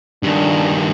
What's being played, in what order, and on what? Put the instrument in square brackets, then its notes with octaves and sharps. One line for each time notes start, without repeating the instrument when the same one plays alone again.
[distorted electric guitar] G2 D#3 [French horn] D4